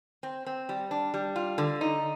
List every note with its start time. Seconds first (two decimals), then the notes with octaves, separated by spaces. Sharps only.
0.23 C4
0.46 C4
0.69 G3
0.91 D4
1.14 G3
1.36 F4
1.58 D3
1.81 D#4